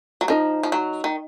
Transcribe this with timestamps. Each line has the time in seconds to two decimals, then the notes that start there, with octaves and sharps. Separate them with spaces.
0.21 F#3
0.28 F3 D#4 A#4 D#5 A#5
0.63 F3
0.72 F#3
1.04 D#3